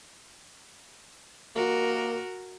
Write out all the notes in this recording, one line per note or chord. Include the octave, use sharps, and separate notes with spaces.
A#3 F#4 A#4